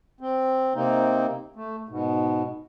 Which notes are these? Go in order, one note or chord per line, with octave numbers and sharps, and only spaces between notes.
C4
C3 A#3 C4 D#4
A3
G#2 B2